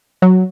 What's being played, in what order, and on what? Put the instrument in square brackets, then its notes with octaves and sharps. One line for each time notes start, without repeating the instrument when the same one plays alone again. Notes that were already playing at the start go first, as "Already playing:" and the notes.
[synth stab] F#3